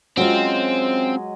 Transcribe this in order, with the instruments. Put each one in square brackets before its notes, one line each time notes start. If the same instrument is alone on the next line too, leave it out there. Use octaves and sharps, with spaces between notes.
[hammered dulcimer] F#3 G#3 D#5 [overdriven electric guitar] C4 [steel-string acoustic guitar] C#4 F4